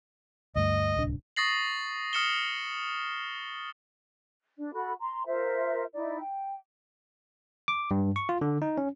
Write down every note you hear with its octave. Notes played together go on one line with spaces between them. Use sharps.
D2 G2 D#5
D1 C2 D4
C#6 D#6 A6 A#6 C7 F#7
D#6 F6 C#7 E7 G7
D4 D5
F#4 A4 B5
A#5 C6
F4 A#4 C5 E5
D#4 E4 D5
G5
D6
G2
C#6
F4
D3
D#4
C#4